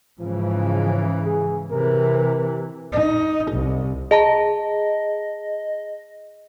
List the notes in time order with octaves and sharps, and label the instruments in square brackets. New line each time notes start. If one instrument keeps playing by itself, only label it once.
[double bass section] G#2 C#3 E3 [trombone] F3
[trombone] G#4
[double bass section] C3 E3 [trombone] A#4
[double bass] D#4
C2
[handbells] G#4 A5 A#5 [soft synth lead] D#5